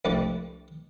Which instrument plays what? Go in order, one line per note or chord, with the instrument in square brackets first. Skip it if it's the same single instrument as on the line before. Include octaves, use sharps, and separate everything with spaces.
[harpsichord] C2 F3 G3 A3 D4 D6